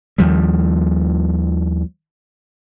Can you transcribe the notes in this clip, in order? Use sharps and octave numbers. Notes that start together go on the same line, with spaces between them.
D#2 F3 G3